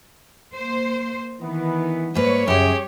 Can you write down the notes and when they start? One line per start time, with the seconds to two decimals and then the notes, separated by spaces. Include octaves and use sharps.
0.55 A#3 C5
1.42 D#3 E3 B3
2.15 G#2 G3 A#3 B4 C#5
2.48 F#2 C#3 G4 G#4